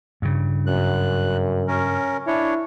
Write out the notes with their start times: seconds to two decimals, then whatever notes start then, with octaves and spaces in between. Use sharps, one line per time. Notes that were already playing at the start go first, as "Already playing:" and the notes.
0.22 G2 C#3
0.66 F#2 F#6
1.68 C#4 A#4
2.27 D4 E4 C#5